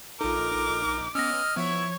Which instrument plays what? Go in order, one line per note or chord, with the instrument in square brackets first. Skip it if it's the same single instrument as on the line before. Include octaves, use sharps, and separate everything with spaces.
[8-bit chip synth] A#1 D#4 [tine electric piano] F4 A4 [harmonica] A#4 [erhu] D6
[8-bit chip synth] B3 C#4 [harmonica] D#5 F6 [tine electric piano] E6 A#6
[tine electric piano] F3 [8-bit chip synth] B3 E5 [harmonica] E4 [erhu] C#5